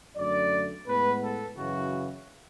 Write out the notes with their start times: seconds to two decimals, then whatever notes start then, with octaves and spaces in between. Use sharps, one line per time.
0.17 F#2 D3 A3 D5
0.86 A2 G#3 B3 B4
1.22 A4
1.56 F#2 C#3 E3 F#4